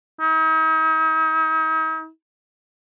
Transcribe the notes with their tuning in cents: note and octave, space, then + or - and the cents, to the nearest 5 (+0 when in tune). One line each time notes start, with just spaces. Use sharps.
D#4 +40